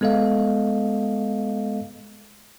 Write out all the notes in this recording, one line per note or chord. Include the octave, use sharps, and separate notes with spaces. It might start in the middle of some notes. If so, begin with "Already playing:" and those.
G#3 B3 A4 D#5 F5